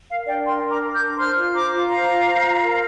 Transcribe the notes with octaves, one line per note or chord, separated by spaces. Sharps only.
A#4 F5
D4 D5 G5
A#4 G5 C6
D4
A#5 D6
A#4
D6 G6
D4
C5 C6 F6
F4
C5 A#5 D6
F4
C5 F5 A#5
F4
C5
F4
A#4